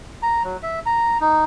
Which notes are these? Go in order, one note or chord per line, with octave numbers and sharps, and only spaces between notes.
A#5
F#3
E5
A#5
D#4